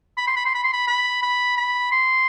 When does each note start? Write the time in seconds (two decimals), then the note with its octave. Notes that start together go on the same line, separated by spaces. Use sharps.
0.17 B5
0.27 C6
0.36 B5
0.45 C6
0.55 B5
0.64 C6
0.73 B5
0.87 B5
1.23 B5
1.57 B5
1.92 C6